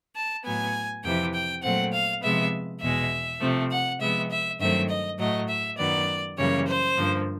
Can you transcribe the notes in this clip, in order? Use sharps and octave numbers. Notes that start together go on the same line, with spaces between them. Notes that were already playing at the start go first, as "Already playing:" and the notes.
A5
A2 F#3 B3 G#5
F2 C3 E3 G5
G5
A#2 F#3 A3 C4 F#5
F5
C3 F3 G#3 B3 E5
E2 B2 G#3 E5
C3 F3 A3 C4
F#5
C3 F3 G#3 B3 E5
E5
G2 D#3 F#3 A3 C4 E5
D#5
A2 F#3 A3 D#5
E5
F#2 D#3 F#3 B3 D5
F#2 C#3 E3 G3 A#3 C#5
C5
G2 D3 F3 A#3